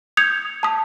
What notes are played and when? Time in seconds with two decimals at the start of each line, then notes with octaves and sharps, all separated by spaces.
0.17 D#6 G6 G#6 C#7 F7
0.63 A5 D#6